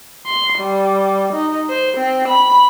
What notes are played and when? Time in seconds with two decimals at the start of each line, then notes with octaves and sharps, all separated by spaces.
0.27 C6
0.58 G3
1.33 D#4
1.69 C5
1.98 C4
2.29 B5